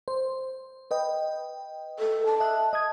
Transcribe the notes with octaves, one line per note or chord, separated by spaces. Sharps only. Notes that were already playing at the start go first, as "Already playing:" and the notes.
C5
B4 D#5 G5
A4
A5
D#5 E5 F#6
D#5 D#6 G#6